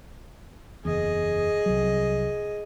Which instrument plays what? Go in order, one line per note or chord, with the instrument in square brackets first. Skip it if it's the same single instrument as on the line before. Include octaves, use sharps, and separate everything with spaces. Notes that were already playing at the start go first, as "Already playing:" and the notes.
[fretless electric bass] F#1 E2 [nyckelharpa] G#4 D#5
[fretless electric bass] C2 F#3